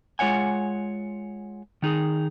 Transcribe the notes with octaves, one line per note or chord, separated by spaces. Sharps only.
G#3 F4 C#5 F#5 G#5
D#3 D#4 G#4